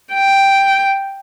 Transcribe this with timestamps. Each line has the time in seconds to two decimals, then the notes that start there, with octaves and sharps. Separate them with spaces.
0.13 G5